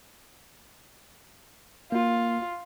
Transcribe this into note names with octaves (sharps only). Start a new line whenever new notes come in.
A#3 F4